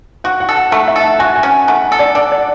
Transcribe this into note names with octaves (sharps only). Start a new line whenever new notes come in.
F#4 F#5
F#5
A4
F#5
A3 F#5
E5
A4
F#5
F#4 G#5
F#5
G#5
C#4
A3 F#5
A4
D5
D4 F#5
D5